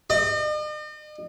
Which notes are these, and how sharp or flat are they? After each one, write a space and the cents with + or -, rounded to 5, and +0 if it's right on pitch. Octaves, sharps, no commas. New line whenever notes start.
D#5 -45